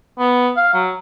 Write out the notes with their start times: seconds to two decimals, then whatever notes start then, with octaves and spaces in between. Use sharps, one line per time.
0.19 B3
0.57 F5
0.74 F#3